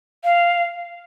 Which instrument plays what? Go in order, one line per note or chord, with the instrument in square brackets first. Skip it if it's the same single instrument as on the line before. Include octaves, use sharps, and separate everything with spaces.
[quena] F5